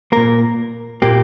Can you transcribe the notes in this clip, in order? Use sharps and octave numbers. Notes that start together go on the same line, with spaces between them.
A#2 A#3 A#4
A#2 A#3 G4